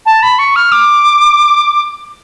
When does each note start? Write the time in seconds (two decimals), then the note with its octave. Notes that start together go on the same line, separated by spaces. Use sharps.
0.06 A5
0.22 B5
0.39 C#6
0.56 F6
0.72 D6